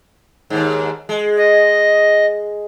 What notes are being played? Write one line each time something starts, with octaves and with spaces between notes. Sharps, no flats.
D#2 G#2
G#3
D#5